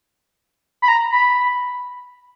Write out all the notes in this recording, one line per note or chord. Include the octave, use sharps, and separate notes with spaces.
B5
A#5
B5